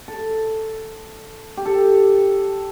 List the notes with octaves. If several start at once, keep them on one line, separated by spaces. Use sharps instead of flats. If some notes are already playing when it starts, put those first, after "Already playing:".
A4
G4
A4